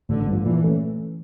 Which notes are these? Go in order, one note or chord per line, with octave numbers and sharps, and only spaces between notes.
A1 D3
G2 F3
A#2 E3
A3 C#4